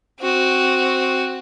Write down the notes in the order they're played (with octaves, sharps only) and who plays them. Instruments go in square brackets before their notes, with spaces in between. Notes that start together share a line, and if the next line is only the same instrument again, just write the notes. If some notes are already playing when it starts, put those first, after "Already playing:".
[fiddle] C4 F#4